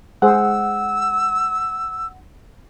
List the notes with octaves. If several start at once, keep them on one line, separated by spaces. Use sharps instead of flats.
G#3 G#4 C5 F#5 E6